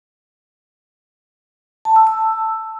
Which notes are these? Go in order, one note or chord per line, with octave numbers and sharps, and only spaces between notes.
A5
E6
E6